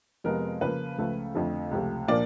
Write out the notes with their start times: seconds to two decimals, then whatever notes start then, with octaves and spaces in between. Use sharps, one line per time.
0.24 F2 C3 F3 G#3 B3 A#4
0.61 C#3 F3 A#3 B4
0.98 C#2 C#3 F3 A3
1.35 F2 D3 F3 A3
1.71 C#2 C3 F3 A3
2.08 A#2 F3 A#3 D4 D5